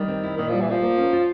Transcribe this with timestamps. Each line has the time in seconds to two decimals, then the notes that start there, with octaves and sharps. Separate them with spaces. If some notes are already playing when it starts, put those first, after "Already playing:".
Already playing: D#3 G3
0.08 C4
0.23 E4
0.37 A#2 D#3
0.49 F3 G3
0.61 E3
0.68 F3 C4
0.82 A#3
0.97 C#4
1.13 F4